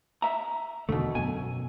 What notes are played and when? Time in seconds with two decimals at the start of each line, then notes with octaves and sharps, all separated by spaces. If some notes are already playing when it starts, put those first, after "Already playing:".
0.22 E5 A#5
0.89 E2 B2 D3 D#3 A3
1.15 F#2 B2 G#5